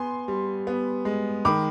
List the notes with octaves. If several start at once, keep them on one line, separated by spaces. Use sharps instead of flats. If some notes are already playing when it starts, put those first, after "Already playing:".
Already playing: B3 G#5 C6
G3
B3
G#3
D#3 B5 D6